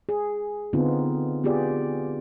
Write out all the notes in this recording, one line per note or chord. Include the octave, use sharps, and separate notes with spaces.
G#4
D3 B3 C4 D#4 F4
B3 F4 G4 G#4 D5